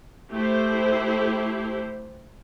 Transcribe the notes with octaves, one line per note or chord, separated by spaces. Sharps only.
A3 E4 G4 C5